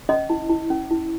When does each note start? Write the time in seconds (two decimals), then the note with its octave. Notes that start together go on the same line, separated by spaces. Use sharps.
0.09 C#4 D#5
0.30 E4
0.49 E4
0.70 C#4
0.91 E4